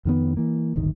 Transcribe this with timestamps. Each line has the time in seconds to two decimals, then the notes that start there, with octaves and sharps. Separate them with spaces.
0.05 F2 D#3 B3
0.37 E3 A#3
0.76 D1 G1 D#3